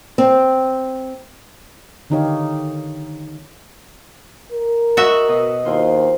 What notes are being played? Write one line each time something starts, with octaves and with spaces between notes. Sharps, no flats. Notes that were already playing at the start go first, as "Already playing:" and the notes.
C4
D3 D#3 D#4 G4 C#5 F5
A#4
F#4 D#5 E5 F#5 D#6
B2 D#5
D#2 E4 F4 C5